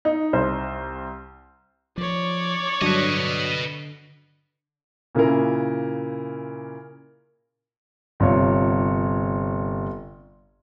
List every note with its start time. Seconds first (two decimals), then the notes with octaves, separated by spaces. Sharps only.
0.05 D#4
0.33 C2 C5
1.98 F3 C#5 D5
2.81 G2 D3 F#3 D4 B4 D#5
5.15 A#2 C#3 A#3 E4 A#4
8.20 G1 C3 F4 C#5